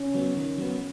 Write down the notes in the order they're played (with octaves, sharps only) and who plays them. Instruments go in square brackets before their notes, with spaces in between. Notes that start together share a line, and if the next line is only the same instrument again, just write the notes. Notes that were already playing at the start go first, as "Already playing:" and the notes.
Already playing: [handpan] C#4
[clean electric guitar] F#3 B3
D#3
F#3 B3